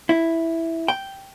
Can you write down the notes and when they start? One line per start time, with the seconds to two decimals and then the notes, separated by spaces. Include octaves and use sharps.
0.09 E4
0.88 G5